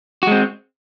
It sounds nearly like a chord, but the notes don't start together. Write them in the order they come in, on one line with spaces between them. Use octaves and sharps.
F#4 G#3 C4